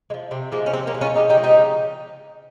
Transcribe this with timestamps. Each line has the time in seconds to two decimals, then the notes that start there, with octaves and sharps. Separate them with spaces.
0.10 G#3
0.14 F3
0.31 C3 C4
0.52 F3 G#3 A#3
0.66 C#4
0.73 C3 C4
0.87 A#3 C#4
0.94 F3
0.98 G#3 C#4 F4
1.15 C#3 D#4 G4
1.29 D#4 G4
1.37 F3 G#3
1.43 D#4 G4
1.57 C#3